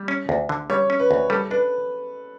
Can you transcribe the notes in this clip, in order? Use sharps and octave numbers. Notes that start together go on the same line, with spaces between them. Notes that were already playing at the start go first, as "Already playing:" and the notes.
Already playing: G3
C#4
D2
D3
G3 C#5
C#4
B4
D2
G3 A4
D4 B4